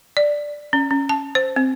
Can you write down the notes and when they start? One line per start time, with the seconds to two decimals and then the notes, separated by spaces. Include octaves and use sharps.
0.17 D5
0.73 C#4
0.91 C#4
1.09 A5
1.35 C5
1.56 C4